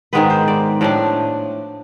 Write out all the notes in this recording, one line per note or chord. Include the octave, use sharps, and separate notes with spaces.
G#2 D#3 G#3 B3 B4
C5
D5
A2 F3 A3 D4 D5